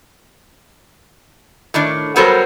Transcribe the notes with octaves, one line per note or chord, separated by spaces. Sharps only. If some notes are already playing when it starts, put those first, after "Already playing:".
A2 D#3 D4
F#3 G3 B3 A4 A#4 C5